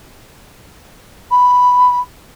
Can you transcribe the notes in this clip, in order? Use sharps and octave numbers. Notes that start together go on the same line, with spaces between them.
B5